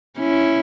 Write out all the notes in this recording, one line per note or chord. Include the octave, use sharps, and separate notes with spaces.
C#4 E4